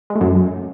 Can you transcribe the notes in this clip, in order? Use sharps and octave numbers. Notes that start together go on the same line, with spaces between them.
G#3
A3
F#2